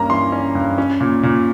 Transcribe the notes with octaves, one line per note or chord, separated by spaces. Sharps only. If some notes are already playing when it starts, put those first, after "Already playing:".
Already playing: G2 A#3 C#4 A#5
E3 C6
C#4
G2
C#4
A#2
A#2